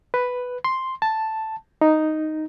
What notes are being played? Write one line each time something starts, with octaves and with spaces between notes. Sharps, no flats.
B4
C6
A5
D#4